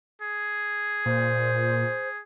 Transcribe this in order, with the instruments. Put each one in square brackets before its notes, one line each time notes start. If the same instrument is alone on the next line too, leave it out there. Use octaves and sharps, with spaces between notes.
[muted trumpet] G#4
[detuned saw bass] A#2 [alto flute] C5